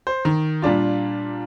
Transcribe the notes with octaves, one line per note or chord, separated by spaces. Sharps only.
C5
D#3
A#2 G3 D4 F4